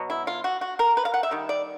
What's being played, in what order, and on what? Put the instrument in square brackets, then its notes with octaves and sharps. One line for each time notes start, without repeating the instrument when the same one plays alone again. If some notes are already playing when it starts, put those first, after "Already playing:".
Already playing: [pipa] B2 F#3 B3
E4
F4
F#4
F#4
A#4
B4
F5
F#5
E5
D#3 G3
D5